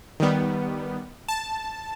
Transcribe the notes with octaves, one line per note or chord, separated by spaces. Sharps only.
D#3 G3 B3
A5